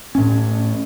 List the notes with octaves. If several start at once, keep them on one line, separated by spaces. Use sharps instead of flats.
A2 C#4